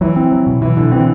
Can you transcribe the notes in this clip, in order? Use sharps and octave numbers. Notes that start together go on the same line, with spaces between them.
E3 F#3
C4
F#3
B2
B2 E3
B2 D3
E3 C4